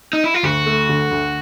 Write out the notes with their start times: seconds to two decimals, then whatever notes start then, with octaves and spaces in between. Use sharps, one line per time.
0.13 D#4
0.24 E4
0.34 F4
0.43 D2 F#4
0.66 A3
0.89 D3
1.11 D2